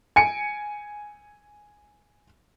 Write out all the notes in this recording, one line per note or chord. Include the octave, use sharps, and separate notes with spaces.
G#5 C#7 D7